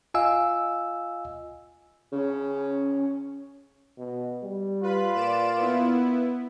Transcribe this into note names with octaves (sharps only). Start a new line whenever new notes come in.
F4 D#5 F5 G#5 E6
C#3 C#4
B2
G3
F4 B4 B5
A#2 D5 D7 E7
B3 E4